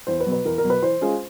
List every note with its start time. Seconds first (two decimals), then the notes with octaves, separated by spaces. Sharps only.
0.07 E2 C5
0.20 B4
0.26 B2 F#3
0.32 B4
0.45 E2 A#4
0.58 A#4
0.63 B2 F#3
0.70 B4
0.82 E3 C5
1.01 G#3 C#4 F4 G#4